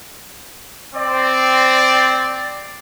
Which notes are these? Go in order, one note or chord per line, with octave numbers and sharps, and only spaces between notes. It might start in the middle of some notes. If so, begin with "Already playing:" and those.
C4 D5